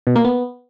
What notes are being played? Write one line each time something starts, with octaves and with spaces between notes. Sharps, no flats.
B2
A#3
B3